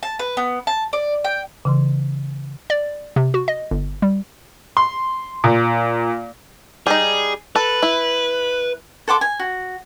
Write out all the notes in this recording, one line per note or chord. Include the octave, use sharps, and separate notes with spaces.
A5
B4
B3
A5
D5
G5
C#3 E3 C6
D5
C3
F#4
D#5
G1
G3
C6
A#2
G3 D#4 G#4
A4 B4
E4
A4 F#5 C6 D6
G#5
F#4